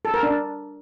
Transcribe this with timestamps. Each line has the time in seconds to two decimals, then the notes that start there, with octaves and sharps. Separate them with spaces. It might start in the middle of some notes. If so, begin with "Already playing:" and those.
0.05 A4
0.14 A#4
0.23 D4